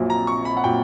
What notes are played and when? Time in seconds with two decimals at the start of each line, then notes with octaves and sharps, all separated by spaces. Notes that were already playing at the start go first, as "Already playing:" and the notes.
Already playing: A#1 A#2 F#3
0.10 A#5
0.27 C#6
0.45 B5
0.57 F#5
0.64 A#2 F#3 G5